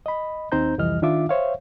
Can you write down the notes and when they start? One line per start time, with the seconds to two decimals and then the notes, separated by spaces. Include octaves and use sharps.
0.06 D#5 B5
0.52 D#2 C4 D#4 C5 A#5 G6
0.78 C2 F2 E3 G3 D#5 F6
1.02 D#3 D4 F4 E5 D6
1.29 C5 C#5 E5 F5